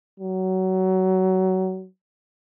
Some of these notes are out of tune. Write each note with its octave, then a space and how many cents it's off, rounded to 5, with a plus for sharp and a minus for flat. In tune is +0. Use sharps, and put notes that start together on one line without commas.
F#3 +20